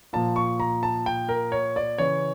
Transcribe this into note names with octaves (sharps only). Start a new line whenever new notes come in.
A#2 F3 A5
C#6
A#5
A5
G5
A#4
C#5
D5
C#3 E3 C#5